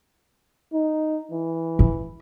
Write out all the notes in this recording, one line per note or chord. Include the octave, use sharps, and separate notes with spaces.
D#4
E3
E4